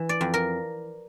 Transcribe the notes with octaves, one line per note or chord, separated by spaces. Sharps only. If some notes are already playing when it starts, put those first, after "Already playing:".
Already playing: E3
D5
F2
A#4